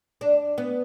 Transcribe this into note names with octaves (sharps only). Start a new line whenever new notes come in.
D4
B3